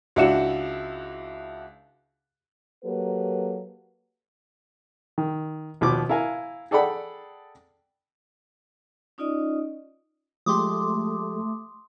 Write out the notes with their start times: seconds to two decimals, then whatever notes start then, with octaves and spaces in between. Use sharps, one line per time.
0.16 C#2 D4 E4 F#4 C#7 E7
2.84 F#3 A#3 G4 A4 B4
5.18 D#3
5.81 D#2 B2 F3 B4 D6
6.09 E4 A#4 F5 G#5
6.71 G#4 A4 D5 F#5 G5 B5
9.18 C#4 D#4 F4 D5 D#5 D#6
10.46 F3 G#3 A3 G4 C6 D6 D#6